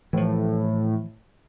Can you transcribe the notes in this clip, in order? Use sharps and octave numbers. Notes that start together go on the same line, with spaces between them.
A2 E3 F3